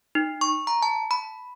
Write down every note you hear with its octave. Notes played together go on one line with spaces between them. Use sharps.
D#4
C#6
A#5
A5
B5